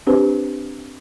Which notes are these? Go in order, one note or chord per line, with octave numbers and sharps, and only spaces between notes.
C4 D4 G4 B4 C5